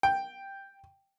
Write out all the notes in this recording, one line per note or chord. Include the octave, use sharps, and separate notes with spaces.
G5